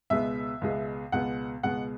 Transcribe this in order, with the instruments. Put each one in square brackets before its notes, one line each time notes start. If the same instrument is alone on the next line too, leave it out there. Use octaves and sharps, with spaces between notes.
[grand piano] C#2 B2 G#3 B3 E5
C#2 B2 G#3 B3
C#2 B2 G#3 B3 F#5
C#2 B2 G#3 B3 F#5